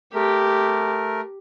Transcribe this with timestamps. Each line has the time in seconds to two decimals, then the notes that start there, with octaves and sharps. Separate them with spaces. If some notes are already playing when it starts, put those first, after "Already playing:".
0.14 A3 G4 A#4